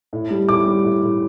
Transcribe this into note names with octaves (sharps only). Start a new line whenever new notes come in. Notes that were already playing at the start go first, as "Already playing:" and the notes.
A2
G3
A2 D6
G3
A2
A2